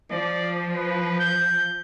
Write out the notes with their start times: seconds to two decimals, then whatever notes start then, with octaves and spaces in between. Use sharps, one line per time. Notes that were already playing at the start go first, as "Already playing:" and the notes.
0.11 F3 D5
0.76 B4
1.20 G6